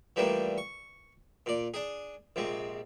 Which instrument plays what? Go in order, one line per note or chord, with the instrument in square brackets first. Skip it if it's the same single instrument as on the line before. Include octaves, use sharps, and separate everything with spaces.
[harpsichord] E3 F3 G3 A3 A#3 D4
C#6
A#2 D5
D4 G#4
A#1 C3 G#3